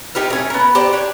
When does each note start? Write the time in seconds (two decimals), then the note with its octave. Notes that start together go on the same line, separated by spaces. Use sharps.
0.15 D#4 G4 A#4 D#5
0.30 A3 C#4
0.50 B3 A#4
0.75 G4 C5 D5 G5
0.93 D4 G4 C#5